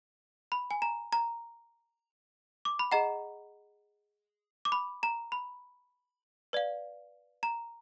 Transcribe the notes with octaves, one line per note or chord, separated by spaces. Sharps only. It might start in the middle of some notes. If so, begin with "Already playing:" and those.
B5
G#5
A#5
A#5
D6
B5
G#4 D#5 F#5 A#5
D6
B5
A#5
B5
B4 D5 F5
A#5